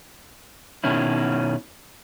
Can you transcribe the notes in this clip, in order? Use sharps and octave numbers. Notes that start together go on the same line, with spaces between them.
B2 D#3 C#4 E4